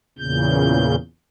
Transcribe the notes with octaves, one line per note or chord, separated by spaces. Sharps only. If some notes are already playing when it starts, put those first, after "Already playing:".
E2 A#2 C#3 G6